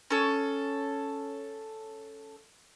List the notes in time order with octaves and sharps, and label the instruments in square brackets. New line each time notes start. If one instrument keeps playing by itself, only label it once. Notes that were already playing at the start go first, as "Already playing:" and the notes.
[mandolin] C#4 A4